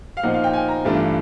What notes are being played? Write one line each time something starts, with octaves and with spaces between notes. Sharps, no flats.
F5
A#2 F3 A#3 D#4 F#5
F5
G5
G#5
A#5
G2 E3 A3 D4 F4